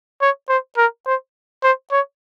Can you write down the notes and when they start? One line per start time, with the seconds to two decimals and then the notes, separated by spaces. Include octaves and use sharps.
0.22 C#5
0.49 C5
0.77 A#4
1.07 C5
1.63 C5
1.92 C#5